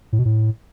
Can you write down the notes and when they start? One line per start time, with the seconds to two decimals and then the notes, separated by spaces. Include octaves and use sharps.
0.13 A2
0.19 B2
0.25 A2